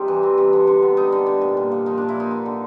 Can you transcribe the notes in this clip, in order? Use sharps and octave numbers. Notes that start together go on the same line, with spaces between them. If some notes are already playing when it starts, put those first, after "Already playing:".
Already playing: C3 G3 D#4
E3
C4
C3
D3
D3
B3
G3 D#4
D3
D3
A#2
A#2
A#3
F3 D#4
A#2 D4
E4
A#2 D#4
D3
D3